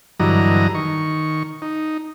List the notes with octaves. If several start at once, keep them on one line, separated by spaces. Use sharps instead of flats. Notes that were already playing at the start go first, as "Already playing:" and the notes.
G2 D3 E3 F#3 D#5 A#5
D#3 C#6
D#4